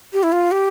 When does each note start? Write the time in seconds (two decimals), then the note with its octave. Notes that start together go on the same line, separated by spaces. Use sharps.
0.13 G4
0.23 E4
0.32 F4
0.52 G4